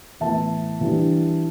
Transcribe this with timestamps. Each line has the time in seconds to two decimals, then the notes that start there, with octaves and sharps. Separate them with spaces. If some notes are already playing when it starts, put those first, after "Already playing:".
0.20 A2 E3 B3 E4 E5 A5
0.81 E3 G3 D4